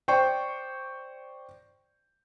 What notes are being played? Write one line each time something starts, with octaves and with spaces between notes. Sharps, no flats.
C5 D5 G5 C#6